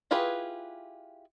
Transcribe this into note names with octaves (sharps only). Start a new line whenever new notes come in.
E4 F4 G4 G#4 B4